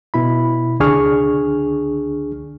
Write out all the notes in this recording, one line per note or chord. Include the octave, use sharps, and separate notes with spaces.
B2 E4 B5
C#2 D3 D4 G#4 C#6 F6